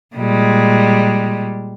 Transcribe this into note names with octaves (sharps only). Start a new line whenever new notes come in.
A#2 G3 G#3